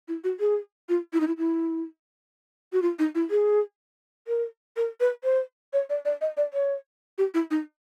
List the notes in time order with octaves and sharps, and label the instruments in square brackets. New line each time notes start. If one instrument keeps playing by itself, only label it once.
[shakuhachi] E4
F#4
G#4
F4
E4
D#4
E4
E4
F#4
F4
D#4
E4
G#4
A#4
A#4
B4
C5
C#5
D5
D5
D#5
D5
C#5
G4
E4
D#4